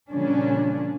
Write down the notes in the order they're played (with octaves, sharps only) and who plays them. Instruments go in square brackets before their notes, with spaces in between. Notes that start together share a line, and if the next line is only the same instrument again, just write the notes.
[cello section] A#2 C#3 F3 G3 C#4 D4